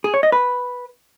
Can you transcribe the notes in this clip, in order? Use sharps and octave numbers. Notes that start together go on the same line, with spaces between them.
G#4
C#5
D#5
B4